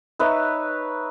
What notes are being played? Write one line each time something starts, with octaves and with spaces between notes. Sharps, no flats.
D#4 B4 C#5 E5